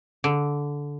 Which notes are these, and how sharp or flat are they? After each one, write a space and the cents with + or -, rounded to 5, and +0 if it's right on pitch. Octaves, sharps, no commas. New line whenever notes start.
D3 -15